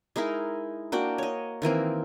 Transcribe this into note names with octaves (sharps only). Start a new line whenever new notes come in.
G#3 D#4 E4 A#4
A#3 D4 F#4 G5
C#5 D#5
D#3 E3 A#3 C4